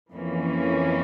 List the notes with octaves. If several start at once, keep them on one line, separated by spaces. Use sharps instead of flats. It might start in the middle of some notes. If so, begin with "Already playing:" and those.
F2 E3 A#3 C#4